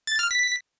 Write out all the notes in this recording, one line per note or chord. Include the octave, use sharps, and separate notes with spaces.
A6
F6
B6